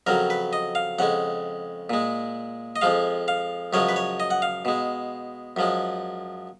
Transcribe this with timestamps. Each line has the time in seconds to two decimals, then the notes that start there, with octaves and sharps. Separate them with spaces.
0.07 F2 C#3 F#3 A#4
0.30 B4
0.53 D#5
0.75 F5
0.99 F2 C#3 G#3 F#5
1.90 A#2 G#3
2.76 D#5
2.81 F2 F3 G#3 F5
3.28 F5
3.73 F#2 C#3 F3 G#3 C#5
3.88 B4
3.96 C#5
4.20 D#5
4.31 F#5
4.42 F5
4.65 B2 G#3
5.56 F#2 F3 G#3